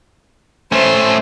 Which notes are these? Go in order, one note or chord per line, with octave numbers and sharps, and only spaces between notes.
A3 C#4 C5